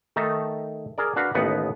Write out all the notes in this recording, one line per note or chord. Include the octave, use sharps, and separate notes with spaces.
D#3 A3 D#4 A5 A#5
G#4 A#4 D5
D4 F#4 B4 F5
A1 D#2 B3 D#4 B4 F#5